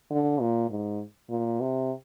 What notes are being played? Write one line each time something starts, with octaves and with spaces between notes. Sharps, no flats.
D3
A#2
G#2
A#2
C3